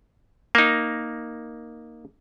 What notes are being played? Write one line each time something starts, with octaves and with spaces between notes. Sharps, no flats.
A#3 D#4